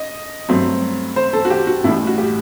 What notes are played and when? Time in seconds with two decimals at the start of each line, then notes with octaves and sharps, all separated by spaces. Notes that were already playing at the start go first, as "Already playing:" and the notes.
Already playing: D#5
0.49 G2 F#3 A3 C4
1.16 C5
1.33 A4
1.45 F#4
1.50 G4
1.67 F#4
1.84 A1 A2 G3 E4
2.07 F#4
2.18 G4